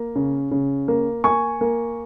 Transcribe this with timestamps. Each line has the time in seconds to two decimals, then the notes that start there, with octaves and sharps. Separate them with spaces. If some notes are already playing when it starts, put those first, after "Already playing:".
Already playing: A#3
0.15 C#3
0.51 C#3
0.88 A#3
1.24 A#3 G#5 C#6
1.61 A#3